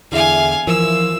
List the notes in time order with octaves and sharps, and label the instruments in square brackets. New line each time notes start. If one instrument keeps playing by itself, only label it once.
[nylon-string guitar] E2 D3 [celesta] E4 G#4 E5 [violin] F5 G#5
[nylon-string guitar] E3 F3 [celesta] A#4 [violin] E6